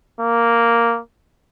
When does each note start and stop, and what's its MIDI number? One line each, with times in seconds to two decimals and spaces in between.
0.21 1.00 58